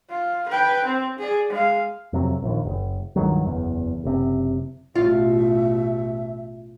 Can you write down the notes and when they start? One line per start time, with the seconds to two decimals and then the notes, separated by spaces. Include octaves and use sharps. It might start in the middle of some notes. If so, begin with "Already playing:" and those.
0.10 F4
0.49 B4 G5
0.85 C4
1.19 G#4 D5
1.51 G#3 F5
2.13 F2 C3 F#3
2.42 A#1 D#2
2.66 F#1
3.16 C#2 G2 D#3 F#3
3.45 F#1 E2
4.04 F#1 C3
4.95 A1 B2 F4 E5